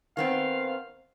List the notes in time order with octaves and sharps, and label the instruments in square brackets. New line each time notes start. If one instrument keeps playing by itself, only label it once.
[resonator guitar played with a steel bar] D#3 B3 C4 [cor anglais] F5